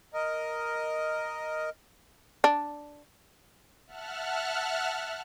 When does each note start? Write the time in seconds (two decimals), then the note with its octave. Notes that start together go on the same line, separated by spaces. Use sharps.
0.14 A#4 D#5
2.44 D4
3.87 E5 F#5 A5 F6 F#6